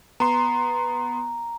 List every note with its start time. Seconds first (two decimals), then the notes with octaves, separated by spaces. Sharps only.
0.20 B3 A#5 C6